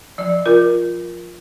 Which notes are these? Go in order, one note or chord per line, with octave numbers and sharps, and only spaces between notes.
F3 D5
F4 A#4